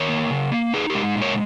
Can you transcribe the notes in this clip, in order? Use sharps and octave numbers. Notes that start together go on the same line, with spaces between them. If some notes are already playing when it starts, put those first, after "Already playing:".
Already playing: D#3 A#4 C#5
A#3
C#3
A#3
D#4 G#4 B4
G#3 G4 A#4
A#2
A#4 C#5